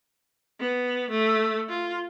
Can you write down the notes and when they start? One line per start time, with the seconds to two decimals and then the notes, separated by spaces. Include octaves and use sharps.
0.60 B3
1.11 A3
1.69 F4